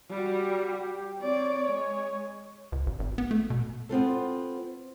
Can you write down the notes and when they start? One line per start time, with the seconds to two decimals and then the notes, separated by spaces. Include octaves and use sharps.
0.10 G3 F#4 G4
1.20 C4 C#5 D5
1.66 G#3
2.72 C#2
2.86 A1
2.99 G#1
3.18 B3
3.31 A3
3.50 B2
3.89 B3 C4 F4 A4